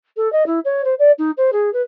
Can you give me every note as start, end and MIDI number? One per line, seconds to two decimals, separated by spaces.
0.16 0.30 69
0.32 0.46 75
0.46 0.59 64
0.64 0.82 73
0.84 0.94 72
0.99 1.11 74
1.18 1.30 63
1.37 1.50 72
1.52 1.72 68
1.73 1.81 71